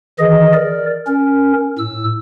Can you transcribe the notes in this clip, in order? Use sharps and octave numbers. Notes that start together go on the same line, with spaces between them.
D#3 E3 G#4 D#5
A#4 D5
C#4 A#4
A2 E6